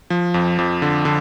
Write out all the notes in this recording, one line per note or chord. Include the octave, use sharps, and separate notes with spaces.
F3
F2
F2
D3
D3